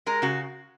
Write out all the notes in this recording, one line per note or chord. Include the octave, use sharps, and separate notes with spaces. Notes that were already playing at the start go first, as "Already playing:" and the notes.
G#3 A#4
C#3 F#4